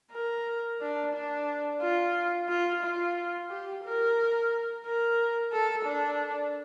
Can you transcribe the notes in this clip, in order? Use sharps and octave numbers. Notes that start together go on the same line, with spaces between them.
A#4
D4
D4
F4
F4
F4
G4
A#4
A#4
A4
D4